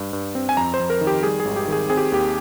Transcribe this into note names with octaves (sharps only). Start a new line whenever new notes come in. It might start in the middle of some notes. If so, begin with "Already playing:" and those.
Already playing: G2
G2
C4
G#5
F2 A#5
C5
F2
A#4
D#3
G4
G3 G#4
G#4
G#1
G4
D#3 G#4
C4 G#4
G4
D#2 G4